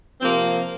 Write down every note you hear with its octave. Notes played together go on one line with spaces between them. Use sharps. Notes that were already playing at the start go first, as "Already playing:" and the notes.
C3 F3 A#3 C4